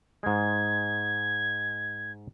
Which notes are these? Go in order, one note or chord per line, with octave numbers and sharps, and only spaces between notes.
G#2 G#3 G#6